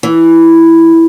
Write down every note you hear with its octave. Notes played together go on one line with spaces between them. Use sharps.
E3